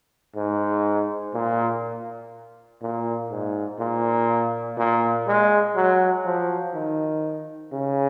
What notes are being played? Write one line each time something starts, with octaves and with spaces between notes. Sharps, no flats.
G#2
A#2
A#2
G#2
A#2
A#2
G#3
F#3
F3
D#3
C#3